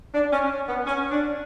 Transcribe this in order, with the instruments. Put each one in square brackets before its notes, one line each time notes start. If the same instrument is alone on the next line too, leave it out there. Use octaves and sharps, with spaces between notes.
[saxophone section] D4
C#4
B3
C#4
D4